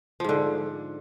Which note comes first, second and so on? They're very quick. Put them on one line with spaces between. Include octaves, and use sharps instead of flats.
F3 G#2 D3